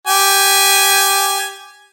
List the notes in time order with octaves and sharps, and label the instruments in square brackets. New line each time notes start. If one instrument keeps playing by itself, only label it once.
[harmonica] G4 G#5